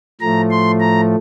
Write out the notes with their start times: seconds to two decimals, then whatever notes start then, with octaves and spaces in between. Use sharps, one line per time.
0.20 A2 F3 A3 A#5
0.50 C6
0.80 A#5